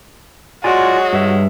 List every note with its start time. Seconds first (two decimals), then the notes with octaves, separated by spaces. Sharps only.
0.64 F#3 G#3 F4 F#4 D5 G#5
1.13 G2 E5